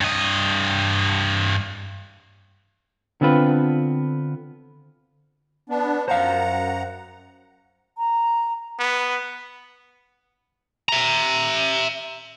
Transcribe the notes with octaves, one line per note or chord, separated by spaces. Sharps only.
G2 D#5
D3 B3 C4 F4 B4
B3 D4
F#2 C5 F5 F#5 A#5
A#5
B3
E5 A#5